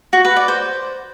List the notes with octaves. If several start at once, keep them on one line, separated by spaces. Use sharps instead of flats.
F#4
B4
D5
C5